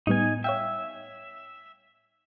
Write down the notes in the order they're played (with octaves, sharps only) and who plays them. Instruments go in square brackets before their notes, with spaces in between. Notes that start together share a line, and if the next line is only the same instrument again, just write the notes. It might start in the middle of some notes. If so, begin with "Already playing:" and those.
[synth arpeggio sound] A2 G3 B3 [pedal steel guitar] D#4 G#5
[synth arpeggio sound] C#5 F5 G5 [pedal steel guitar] E5